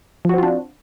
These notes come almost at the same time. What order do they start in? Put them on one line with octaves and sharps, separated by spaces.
F3 F#4 C4 F4 D4